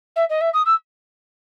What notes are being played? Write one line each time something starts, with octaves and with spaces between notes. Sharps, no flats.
E5
D#5
E5
D#6
E6